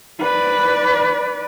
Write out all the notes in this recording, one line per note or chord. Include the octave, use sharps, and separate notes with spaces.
B4 D5